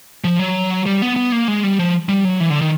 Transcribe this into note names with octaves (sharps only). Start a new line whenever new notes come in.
F3
F#3
G3
B3
B3
A#3
G#3
G3
F3
G3
F#3
E3
D3
D#3